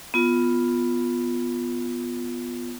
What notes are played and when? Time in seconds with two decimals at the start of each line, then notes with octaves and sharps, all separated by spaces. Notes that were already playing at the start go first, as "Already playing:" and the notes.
0.14 B3 F4